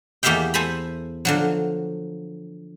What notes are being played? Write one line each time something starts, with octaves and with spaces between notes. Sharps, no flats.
E2 A#3 G4 E5 F5 G5
A4 C5 G#5 A#5 B5
D3 F3 F#3